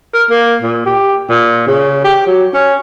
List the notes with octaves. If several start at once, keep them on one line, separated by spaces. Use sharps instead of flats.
A#4
A#3
A#2
G4
A#2
C#3
G4
F#3
C#4